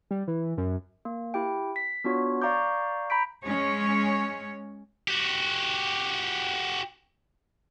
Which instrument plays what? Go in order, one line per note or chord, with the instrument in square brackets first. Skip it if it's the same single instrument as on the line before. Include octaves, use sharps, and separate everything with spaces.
[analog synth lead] G3
E3
F#2
[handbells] A#3
E4 G4 G5
B6
B3 D4 F4 F#4 C#5
D5 F5 A#5 C#6 D6 G6
A#5 B5 G6 B6 D7
[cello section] G#3 C#4 C#5
[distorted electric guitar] F#4 G4